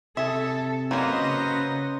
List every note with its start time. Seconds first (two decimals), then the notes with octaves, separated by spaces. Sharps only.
0.17 C3 G#4 A4 E5
0.91 F#3 A#3 C#4 B4 C5 D#5 A#5
1.20 C#3